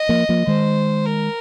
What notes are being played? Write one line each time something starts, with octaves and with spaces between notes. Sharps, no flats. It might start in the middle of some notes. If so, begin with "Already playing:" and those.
Already playing: D#5
F3 A#3
F3 A#3
D#3 G#3 C5
A#4